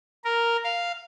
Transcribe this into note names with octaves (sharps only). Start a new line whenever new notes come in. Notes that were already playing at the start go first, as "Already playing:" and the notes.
A#4
F5